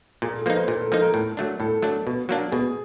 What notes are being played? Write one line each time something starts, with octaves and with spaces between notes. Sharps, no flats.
A#2 G#4
A4
F3 A#3 D#4 B4
C5
A#2 A#4
A4
F3 A#3 D#4 A4
A#4
A2
F#3 A3 D4
A2 A4
F#3 A3 D4
B2
F#3 A#3 D4
B2 G#4